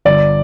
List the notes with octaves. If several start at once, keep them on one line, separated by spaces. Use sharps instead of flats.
G1 D5